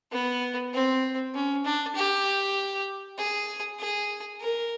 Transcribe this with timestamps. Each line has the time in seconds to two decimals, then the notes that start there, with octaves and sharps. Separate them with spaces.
0.12 B3
0.73 C4
1.34 C#4
1.65 D4
1.95 G4
3.18 G#4
3.79 G#4
4.40 A#4